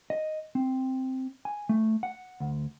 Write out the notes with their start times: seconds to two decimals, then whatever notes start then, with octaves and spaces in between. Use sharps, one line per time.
0.10 D#5
0.55 C4
1.45 G#5
1.69 A3
2.03 F#5
2.40 D2